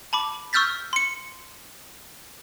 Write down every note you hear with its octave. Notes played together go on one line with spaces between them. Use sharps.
A5 B5 D6
C#6 E6 F6 G6 A6 B6
C6 C#7